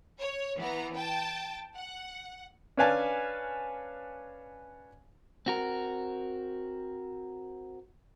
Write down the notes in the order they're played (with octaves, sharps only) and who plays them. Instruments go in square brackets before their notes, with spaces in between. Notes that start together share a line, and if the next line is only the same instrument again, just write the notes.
[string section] C#5
E3 B3 A#5
G5 A5
F#5
[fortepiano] C#4 D4 B4 F5 G#5 A5
[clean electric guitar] C4 F#4 A#4